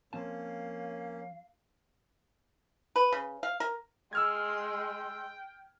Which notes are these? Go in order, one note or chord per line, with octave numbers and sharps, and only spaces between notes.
F3 A#3 C4 C#4 F5 A5
B4
C#3
F5
A#4
G#3 G5 C6 E6 F6 G#6